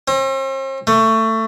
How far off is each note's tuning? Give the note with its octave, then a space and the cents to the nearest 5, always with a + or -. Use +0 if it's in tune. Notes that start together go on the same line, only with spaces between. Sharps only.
C4 +45
A3 +20